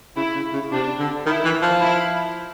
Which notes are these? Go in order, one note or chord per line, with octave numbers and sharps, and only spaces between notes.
C#3 E4
C#3
C#3
C3 D4
D3
D#3 E4
E3
F3
E4